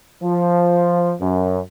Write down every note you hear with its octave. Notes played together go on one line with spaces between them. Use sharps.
F3
F#2